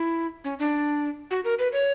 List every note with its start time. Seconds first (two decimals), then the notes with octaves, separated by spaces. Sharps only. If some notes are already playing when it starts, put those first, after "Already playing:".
Already playing: E4
0.44 C#4
0.59 D4
1.31 F#4
1.45 A#4
1.59 B4
1.73 C#5